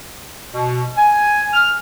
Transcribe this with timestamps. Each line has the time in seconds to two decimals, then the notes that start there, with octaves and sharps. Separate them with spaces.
0.54 B2
0.97 G#5
1.53 F6